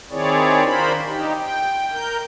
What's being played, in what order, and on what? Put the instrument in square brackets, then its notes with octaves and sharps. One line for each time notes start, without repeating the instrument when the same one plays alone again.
[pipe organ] D#3 C4 E4 G#4 C#5 D5
D4 F4 A#4 C5 B5
D#4 G4
G5
A#4 G6